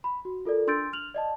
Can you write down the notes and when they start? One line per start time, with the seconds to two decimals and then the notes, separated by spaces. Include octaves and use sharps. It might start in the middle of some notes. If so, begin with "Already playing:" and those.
0.04 B5
0.25 F#4
0.45 F4 A4 A#4 D5
0.67 D4 C6 E6 G6 A6 D7
0.93 F6 F7 F#7
1.14 D5 D#5 A5